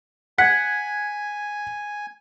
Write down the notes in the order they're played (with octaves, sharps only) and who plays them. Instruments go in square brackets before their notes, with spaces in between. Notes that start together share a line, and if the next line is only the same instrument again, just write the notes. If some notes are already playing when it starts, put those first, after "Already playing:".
[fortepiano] F#5 [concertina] G#5 [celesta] G#6 B6